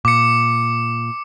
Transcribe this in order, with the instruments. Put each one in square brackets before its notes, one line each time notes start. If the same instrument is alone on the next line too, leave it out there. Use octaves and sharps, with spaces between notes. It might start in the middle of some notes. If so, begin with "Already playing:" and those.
[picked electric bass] A#2 [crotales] D6 C#7